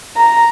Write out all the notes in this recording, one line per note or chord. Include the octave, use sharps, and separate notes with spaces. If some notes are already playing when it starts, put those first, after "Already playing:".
A#5